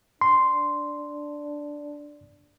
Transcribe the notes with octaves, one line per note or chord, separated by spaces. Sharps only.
D4 C6